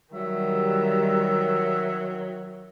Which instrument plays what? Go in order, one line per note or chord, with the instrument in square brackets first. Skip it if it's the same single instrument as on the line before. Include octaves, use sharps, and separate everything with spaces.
[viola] D#3 [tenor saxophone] F#3 [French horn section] G3 [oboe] E5